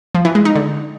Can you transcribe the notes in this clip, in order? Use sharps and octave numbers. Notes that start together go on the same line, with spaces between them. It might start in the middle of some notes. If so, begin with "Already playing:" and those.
F3
E3
G#3
D#4
D3